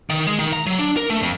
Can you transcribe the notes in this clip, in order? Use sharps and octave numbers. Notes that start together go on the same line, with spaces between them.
D#3
G#3
D#3
A#5
F#3
D4
A#4
A3
F2